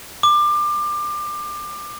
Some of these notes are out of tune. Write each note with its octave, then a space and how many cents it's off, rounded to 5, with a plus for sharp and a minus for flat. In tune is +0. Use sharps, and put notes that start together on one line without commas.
D6 +25